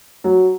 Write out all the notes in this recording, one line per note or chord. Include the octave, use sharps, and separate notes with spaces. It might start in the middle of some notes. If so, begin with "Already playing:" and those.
F#3